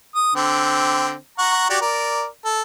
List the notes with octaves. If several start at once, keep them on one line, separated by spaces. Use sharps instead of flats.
D#6
D3 C4
F#5 A#5 C#6
F#4 G4 D5
A#4 D5
A4